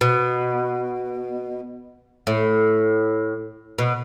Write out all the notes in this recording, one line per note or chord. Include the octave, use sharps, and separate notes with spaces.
B2
A2
B2